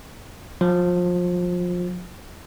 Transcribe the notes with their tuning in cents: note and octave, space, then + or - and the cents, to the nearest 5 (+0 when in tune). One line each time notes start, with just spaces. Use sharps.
F3 +25